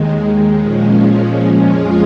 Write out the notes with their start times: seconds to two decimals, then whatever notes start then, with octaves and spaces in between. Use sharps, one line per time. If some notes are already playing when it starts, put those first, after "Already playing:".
Already playing: D#2 D#3 G#3
0.59 A#2 F3 G#3 C#4
1.68 F2 F3 G#3 F4 G#4